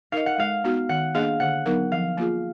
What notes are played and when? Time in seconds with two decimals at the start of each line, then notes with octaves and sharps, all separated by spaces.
0.12 D#4 A#4 D#5 F5
0.26 F#5
0.38 G#3 F5
0.64 B3 D#4 F#4
0.89 D#3 F#5
1.14 A#3 D4 G#4 D#5 F5
1.40 D3 F#5
1.66 F#3 B3 D#4 A#4
1.92 F3 F5
2.17 A#3 F4 G#4